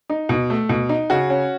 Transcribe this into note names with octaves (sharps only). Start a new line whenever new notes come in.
D#4
B2
A3
B2
D#4
C#3 F#4
C#4